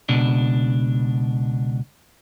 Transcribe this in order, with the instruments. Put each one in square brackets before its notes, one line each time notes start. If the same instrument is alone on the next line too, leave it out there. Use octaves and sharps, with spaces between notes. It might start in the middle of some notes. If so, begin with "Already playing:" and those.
[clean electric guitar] C#2 B2 D4